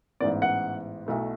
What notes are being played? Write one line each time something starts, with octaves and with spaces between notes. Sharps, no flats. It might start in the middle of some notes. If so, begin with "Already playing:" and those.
A1 G#2 E3 B3 D5
F#5
B1 B2 A3 E4